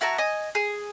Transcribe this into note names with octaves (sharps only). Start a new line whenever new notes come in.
E4 F#4 A5 A#5
D#5 G#5
G#4